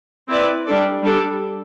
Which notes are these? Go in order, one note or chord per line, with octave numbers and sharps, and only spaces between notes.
C4 E4 B4 D5
G3 D4 A4 D5
G3 D4 A4